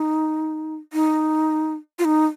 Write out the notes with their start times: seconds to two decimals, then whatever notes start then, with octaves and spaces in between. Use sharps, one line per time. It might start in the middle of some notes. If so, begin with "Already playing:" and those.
Already playing: D#4
0.93 D#4
1.99 F4
2.05 D#4